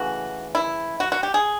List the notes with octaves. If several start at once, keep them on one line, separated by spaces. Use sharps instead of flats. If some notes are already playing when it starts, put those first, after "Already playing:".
Already playing: C#3 E3 A3 F#4
E4
F#4
F#4
G4
G#4